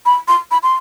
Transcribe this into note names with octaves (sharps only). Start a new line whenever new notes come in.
B5
C6
B5
C6